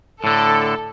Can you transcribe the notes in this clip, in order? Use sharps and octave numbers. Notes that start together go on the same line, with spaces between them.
A2 D3 A4